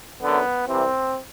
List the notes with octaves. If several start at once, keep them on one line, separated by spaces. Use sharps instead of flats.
F#2 D3 B3
C2 C3 E3 C4